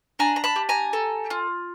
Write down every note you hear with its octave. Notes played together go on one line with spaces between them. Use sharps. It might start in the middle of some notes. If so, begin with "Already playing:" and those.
D4 G#5 A#5
A#5
A5 B5
G4
G#5 A#5
A4
F4